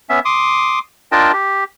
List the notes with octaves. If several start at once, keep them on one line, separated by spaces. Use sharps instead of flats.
B3 C#4 E5
C6 D6 D#6
D4 F4 A#4 D#5 G5 A5
G4